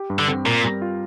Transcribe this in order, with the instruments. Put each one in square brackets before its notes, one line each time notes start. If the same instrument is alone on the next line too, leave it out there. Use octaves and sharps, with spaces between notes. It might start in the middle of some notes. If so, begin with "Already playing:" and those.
Already playing: [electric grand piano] G4
G2
[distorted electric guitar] D3
[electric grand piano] C4
[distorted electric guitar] A#2 [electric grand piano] A#4
[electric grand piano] G3
F4